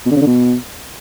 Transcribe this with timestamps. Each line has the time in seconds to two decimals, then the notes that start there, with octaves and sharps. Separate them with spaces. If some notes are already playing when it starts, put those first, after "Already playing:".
0.06 B2
0.11 D3
0.16 C#3
0.21 D3
0.26 B2